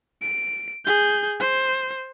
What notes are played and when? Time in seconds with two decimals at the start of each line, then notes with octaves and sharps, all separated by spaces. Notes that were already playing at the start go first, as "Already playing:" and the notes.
0.22 D7
0.85 G#4 G6
1.40 C5